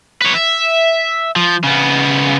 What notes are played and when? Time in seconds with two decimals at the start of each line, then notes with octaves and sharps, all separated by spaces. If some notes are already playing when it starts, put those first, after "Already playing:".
0.22 B4 C#5
0.35 E5
1.36 F3
1.64 C#3 B3